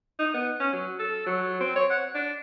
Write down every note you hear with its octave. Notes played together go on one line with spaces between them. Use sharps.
D#4
B3
C#4
F#3
A4
F#3
C4
C#5
F#5
D4